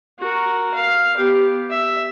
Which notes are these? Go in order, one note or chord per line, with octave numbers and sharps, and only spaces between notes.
F#4 A#4
F5
B3 G4
E5